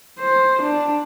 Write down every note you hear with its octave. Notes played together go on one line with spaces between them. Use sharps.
C5
D4